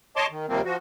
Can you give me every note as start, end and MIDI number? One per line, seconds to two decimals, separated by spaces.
0.16 0.26 73
0.16 0.26 75
0.16 0.26 81
0.16 0.26 84
0.16 0.26 86
0.30 0.46 51
0.48 0.62 39
0.48 0.62 48
0.48 0.62 53
0.48 0.62 55
0.48 0.62 58
0.48 0.62 60
0.65 0.77 53
0.65 0.77 66